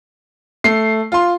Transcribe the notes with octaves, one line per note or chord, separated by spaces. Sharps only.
A3 C7
F4 C6